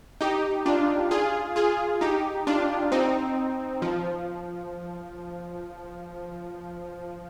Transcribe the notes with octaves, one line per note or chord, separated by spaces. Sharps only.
D#4 G4
D4 F4
F4 G#4
F4 G#4
D#4 G4
D4 F4
C4 D#4
F3